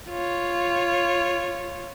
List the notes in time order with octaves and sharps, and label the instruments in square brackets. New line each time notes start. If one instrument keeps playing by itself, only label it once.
[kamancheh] F4 C#5